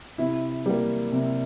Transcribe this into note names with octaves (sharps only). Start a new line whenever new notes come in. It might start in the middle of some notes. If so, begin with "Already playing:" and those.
C3 E4
G3 A#3
C3